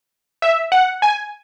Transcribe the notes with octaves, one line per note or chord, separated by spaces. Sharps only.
E5
F#5
G#5